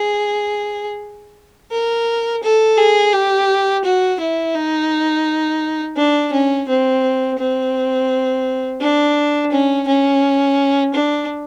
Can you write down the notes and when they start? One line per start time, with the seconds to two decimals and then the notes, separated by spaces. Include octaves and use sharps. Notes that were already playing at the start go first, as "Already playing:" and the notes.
Already playing: G#4
1.71 A#4
2.43 A4
2.78 G#4
3.13 G4
3.84 F#4
4.20 E4
4.55 D#4
5.97 D4
6.33 C#4
6.68 C4
7.38 C4
8.81 D4
9.52 C#4
9.87 C#4
10.94 D4